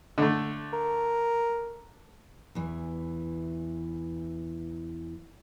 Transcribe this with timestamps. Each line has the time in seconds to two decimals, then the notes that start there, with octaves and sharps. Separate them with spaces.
0.18 D3 A3
0.73 A#4
2.55 E2 E3